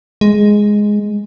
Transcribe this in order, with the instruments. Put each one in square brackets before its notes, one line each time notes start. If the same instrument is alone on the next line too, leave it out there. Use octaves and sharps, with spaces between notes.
[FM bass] G#3